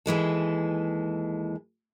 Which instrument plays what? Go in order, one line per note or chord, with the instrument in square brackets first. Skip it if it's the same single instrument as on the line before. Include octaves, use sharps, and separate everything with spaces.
[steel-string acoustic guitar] D#2 E3 G#3 A4